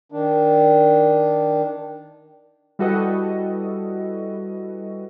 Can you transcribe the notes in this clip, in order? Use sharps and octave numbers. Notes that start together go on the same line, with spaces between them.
D#3 D4
G3 E4 F#4 A4 B4 D#5